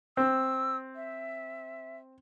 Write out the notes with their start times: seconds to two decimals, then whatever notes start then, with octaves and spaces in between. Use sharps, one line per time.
0.17 C4 E6
0.96 E5